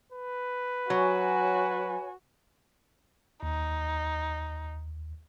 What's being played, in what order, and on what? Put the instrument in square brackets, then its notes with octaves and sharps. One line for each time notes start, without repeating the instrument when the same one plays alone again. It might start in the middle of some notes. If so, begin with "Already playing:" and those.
[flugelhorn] B4
[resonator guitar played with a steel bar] F#3 [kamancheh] F#4 [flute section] C#5 G#5
[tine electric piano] D#2 [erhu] D#4